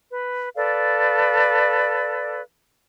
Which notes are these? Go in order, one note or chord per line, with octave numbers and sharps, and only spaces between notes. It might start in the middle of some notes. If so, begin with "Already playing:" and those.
B4
A4 B4 D5 F5